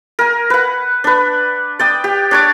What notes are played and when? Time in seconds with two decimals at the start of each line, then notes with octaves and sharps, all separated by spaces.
0.19 A#4 G#5
0.50 B4 F#5
1.04 D4 B4
1.79 D5 G5 D#6
2.04 G4
2.31 D4 C#5 D5